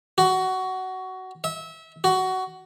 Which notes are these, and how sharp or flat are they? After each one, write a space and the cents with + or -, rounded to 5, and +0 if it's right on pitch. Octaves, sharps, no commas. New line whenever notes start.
F#4 +15
E5 -25
F#4 +15